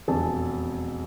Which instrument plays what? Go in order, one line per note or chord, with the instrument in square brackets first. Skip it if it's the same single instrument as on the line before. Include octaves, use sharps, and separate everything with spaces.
[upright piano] E1 F2 D4 G#4 A5